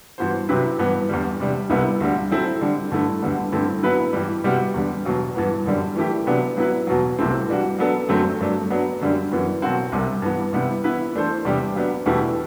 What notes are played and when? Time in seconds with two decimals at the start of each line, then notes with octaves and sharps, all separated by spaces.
0.18 G2 E3 B3 F#4 C5
0.49 C3 F#3 C4 E4 B4
0.79 G2 E3 B3
1.09 E2 D3 G3
1.40 C3 G3 D4
1.70 C2 C3 G3 B3 E4
2.00 D2 D3 G3
2.31 F#3 C4 E4 A4 C5
2.61 D3 G3 D4
2.91 G2 D3 A3 E4
3.22 D2 D3 G3 B3
3.52 G2 D3 A3 C4 E4
3.83 F#3 B3 E4 B4
4.13 G2 E3 G3
4.44 C3 G3 B3 F#4
4.74 E2 D3 G3
5.05 E2 B2 F#3
5.35 G2 E3 B3
5.66 F#2 D3 G3 D4
5.96 E3 A3 E4 G4
6.27 C3 F#3 B3 D4
6.57 F#3 B3 E4 B4
6.87 E2 B2 F#3
7.19 C2 C3 E3 A3 C4
7.48 E3 G3 D4 F#4
7.79 F#3 B3 D4 A4
8.09 F#2 D3 F#3 A3 C4
8.40 G2 F#3 A3 D4
8.70 F#3 B3 D4
9.01 F#2 D3 G3 D4
9.32 F#2 E3 B3
9.62 B2 F#3 C4 F#4
9.92 C2 C3 G3
10.22 G2 E3 B3
10.53 C3 G3 B3 E4
10.84 E3 B3 E4 B4
11.13 E3 A3 D4 A4 C5
11.45 E2 C3 G3 D4 G4
11.75 F#3 B3 D4
12.06 E2 B2 A3 E4 G4